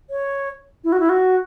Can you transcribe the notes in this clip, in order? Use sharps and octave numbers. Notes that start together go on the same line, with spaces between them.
C#5
E4
F#4
E4
F#4